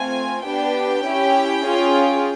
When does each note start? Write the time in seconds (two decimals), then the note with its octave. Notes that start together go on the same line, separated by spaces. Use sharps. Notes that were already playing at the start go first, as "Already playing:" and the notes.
Already playing: A3 C4 F4 G#5
0.45 B3 D4 G4 G5
1.05 C#4 E4 G4
1.64 C#4 F4 G#4